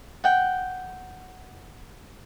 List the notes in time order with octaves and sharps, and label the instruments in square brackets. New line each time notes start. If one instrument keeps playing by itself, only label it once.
[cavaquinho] F#5 G5